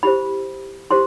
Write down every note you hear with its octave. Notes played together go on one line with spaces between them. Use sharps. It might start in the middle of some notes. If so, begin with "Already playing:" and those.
E4 G4 C5 B5
E4 G4 C5 C6